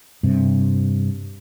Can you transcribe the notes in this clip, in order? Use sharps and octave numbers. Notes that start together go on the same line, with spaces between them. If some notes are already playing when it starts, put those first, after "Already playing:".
G2 C3